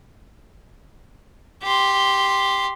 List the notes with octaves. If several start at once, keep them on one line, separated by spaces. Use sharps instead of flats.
G4 C6